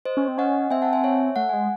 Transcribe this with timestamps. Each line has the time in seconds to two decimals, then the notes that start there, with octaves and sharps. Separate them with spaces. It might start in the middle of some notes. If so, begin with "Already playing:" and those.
0.05 C5 D#5
0.17 C#4
0.28 C4
0.38 C#4 D#5 F#5
0.71 C4 E5 G#5
0.82 F#5 A5
0.93 E5 G#5
1.04 C#5 E5
1.36 A3 F#5
1.49 G#3 G#5